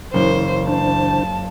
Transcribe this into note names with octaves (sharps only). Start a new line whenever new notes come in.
F#1 C#3 E3 C5
D4 C5 A5